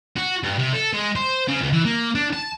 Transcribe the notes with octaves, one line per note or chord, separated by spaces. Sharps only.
F#4
G2
C3
A4
G#3
C5
C#3
C#2
E3
A#3
D4
A5